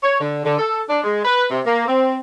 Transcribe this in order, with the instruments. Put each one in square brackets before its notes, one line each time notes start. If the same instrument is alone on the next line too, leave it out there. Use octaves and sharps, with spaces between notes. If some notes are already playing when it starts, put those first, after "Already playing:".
[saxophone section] C#5
D3
D3
A4
D4
G#3
B4
C3
A#3
C4